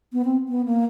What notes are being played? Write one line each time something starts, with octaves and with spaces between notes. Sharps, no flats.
B3
C4
B3
A#3